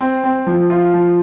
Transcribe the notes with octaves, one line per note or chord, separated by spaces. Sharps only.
C4
C4
F3
F4
F3